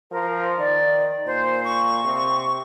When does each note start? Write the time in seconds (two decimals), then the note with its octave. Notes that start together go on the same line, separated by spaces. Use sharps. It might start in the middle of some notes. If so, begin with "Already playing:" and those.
0.11 F3 A#4
0.59 D#3 D5
1.26 A#2 C5
1.64 C#6
2.04 C3